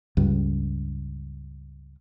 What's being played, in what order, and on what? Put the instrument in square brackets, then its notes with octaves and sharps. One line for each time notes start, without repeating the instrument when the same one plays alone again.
[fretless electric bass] C#2 G2